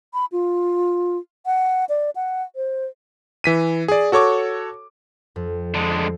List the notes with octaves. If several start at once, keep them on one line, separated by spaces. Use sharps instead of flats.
B5
F4
F#5
D5
F#5
C5
E3 B6 D#7
G#4 D5
F#4 A4 C#5 C#6 D6
F2
D3 G#3